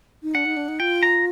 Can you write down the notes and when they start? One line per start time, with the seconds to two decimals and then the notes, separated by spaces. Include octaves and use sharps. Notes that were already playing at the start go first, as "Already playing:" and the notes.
0.23 D#4
0.35 D4 F#5
0.45 D#4
0.57 D4
0.68 D#4
0.80 F4 G5
1.03 A#5